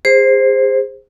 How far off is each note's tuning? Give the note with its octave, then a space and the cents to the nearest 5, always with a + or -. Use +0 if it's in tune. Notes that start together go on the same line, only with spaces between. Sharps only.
G#4 -35 C5 +0